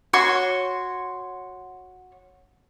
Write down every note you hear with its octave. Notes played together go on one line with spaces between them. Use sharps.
F#4 C#5 C6 C#6